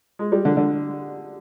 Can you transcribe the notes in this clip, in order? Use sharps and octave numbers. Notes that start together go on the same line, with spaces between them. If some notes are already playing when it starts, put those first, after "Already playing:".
G#3
G3
D3
D3